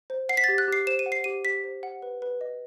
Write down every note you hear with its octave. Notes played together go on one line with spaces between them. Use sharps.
C5
F#5 C7
B6
G4 A6
F#6
G4 C7
C5 E7
D#7
F#5
C7
G4 D#7
G4 B6
C5
F#5
B4
B4
D#5